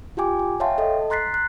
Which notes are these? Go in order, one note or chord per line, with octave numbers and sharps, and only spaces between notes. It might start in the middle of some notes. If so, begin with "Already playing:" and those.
F4 G4 G5 G#5 D6
G#5
C#5 E5 F5 G5 A5 C6
A4 D#5
A#5 C6 F#6 A6 B6 C7
F#6